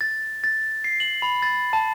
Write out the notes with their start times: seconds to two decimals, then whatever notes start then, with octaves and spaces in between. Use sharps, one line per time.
0.01 A6
0.44 A6
0.84 C7
1.00 F#7
1.22 B5
1.42 A6
1.73 A5